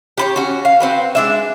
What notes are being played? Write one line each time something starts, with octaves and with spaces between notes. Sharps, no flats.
G4 B4 C#5
C#4 F#4
F5
C4 F#4 B4
G#3 D4 E5